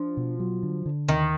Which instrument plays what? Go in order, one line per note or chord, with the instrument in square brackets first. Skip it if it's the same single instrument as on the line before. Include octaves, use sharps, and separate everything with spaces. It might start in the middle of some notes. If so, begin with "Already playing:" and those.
Already playing: [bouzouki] F3 [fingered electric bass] D4
[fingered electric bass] B2
F#3
D3
D3
[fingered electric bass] D#2 [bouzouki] D#3